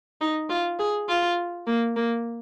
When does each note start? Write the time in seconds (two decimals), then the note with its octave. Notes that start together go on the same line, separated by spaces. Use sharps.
0.21 D#4
0.49 F4
0.79 G#4
1.09 F4
1.67 A#3
1.96 A#3